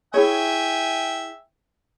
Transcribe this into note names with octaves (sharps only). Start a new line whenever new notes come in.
E4 G#4 C#5 E5 G5 G#5